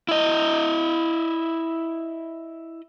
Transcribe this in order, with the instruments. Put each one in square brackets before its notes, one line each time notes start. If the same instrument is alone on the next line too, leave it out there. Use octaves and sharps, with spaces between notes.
[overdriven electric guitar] E4 D#5